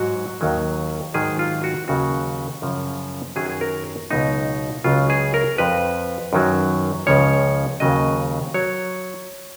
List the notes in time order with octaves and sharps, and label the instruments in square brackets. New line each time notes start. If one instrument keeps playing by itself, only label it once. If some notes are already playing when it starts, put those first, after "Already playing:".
Already playing: [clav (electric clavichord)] G#2 F#3 F#4
D#2 D#3 F#3
G#2 D#3 F#3 G#4
F4
F#4
D#2 C#3 F#3 F#4
F#2 C#3 F3
F#2 D#3 F#3 G#4
G#4
A#4
C#2 B2 F#3 D#4
C#2 C#3 F#3 F4
G#4
A#4
F2 F3 B4
F#2 D#3 F#3
C#2 C#3 F3 C#5
D#2 C#3 F#3 D#5
F#3 C#5